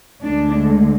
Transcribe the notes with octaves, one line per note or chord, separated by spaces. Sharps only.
D2 D3 G#3 D4